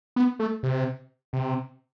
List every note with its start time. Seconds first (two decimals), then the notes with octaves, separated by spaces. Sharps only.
0.16 B3
0.40 A3
0.63 C3
1.33 C3